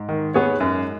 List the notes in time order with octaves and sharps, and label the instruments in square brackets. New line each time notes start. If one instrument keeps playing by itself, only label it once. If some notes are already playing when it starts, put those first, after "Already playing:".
Already playing: [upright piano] G#2
[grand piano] D#3
B3 G#4 C#5
F#2